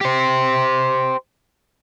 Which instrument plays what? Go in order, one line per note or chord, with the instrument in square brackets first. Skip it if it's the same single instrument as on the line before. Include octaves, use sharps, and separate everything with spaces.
[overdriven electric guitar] G4 C5